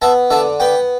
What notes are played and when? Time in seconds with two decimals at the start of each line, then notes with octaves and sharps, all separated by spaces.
0.02 B3 E5 A5
0.30 D3 E5 A5
0.60 B3 G5 B5